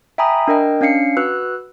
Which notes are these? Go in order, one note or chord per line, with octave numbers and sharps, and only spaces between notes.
E5 G5 G#5 A#5 B5 D#6
D4 A#4 D#5 G5
C#4 D4 F5 C7 C#7
F#4 B4 E6 F#6